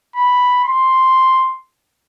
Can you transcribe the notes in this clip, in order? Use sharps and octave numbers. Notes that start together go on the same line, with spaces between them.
B5
C6